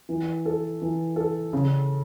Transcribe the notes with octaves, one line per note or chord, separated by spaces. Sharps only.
E3
A4
E3
A4
C#3